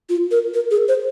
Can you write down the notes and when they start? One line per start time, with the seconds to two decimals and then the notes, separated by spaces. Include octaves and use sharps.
0.09 F4
0.31 A#4
0.54 A#4
0.71 G#4
0.88 C5